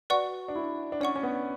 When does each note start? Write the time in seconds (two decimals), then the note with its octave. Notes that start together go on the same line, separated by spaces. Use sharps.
0.10 F#4 B4 D5 F#5 C#6
0.48 D4
0.55 E4
0.92 D4
1.01 C#4 D5 F#5 C#6
1.16 C#4
1.23 B3